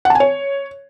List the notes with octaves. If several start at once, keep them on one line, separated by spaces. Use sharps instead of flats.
F#5
A5
G#5
C#5